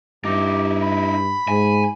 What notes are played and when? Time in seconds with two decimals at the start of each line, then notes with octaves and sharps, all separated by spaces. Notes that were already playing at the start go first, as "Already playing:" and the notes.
0.25 G2 D#4 E4 G4
0.82 B5
1.48 G#2 G#5